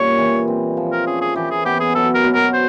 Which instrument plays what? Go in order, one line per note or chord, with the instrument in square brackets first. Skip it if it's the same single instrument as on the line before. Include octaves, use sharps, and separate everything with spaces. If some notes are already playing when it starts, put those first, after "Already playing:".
Already playing: [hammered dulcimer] A#2 G3 C#4 [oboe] C#5
[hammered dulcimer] E3
C4
F3
[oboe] A#4
[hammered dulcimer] C#4 [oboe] G#4
[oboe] G#4
[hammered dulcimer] E3 [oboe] G4
[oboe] G#4
[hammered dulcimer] B3 [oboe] G4
[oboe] G#4
[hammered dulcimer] F#3 [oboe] A4
[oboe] A#4
[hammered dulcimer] B2
[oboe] A#4
C5